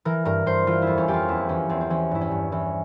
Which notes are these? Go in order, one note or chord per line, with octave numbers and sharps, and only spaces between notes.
E3 A#4
G2 A#4
G2 C5
E3 F4
E4
F2
C#4
F2 G4
F4
E2 E4
E3 C#4
E2 C4
C4
E3 C#4
G2 E4
C#4
G2
E3 C#4